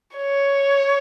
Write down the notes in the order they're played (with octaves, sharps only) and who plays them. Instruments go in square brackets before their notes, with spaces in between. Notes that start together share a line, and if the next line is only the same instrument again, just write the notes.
[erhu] C#5